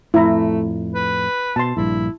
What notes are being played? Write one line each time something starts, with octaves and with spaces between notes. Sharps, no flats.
F2 A2 A3 E4 A#5
B4
B2 A5 C6
A#1 G2 E4